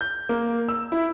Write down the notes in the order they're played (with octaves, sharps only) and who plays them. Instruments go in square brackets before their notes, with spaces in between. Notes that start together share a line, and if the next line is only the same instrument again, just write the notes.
[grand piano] G6
A#3
E6
E4